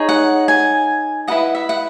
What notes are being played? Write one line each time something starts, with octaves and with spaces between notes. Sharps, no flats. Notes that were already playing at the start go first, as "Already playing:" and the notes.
Already playing: D#4 G#4 C#5
F#5
G#5
E4 B4 D#5 F#5
E5
F#5